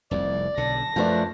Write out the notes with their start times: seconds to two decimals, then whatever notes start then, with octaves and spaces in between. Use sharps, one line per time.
0.11 F1 C2 F2 D5
0.57 B1 D3 A5 A#6
0.96 F#2 F3 A3 D4 B4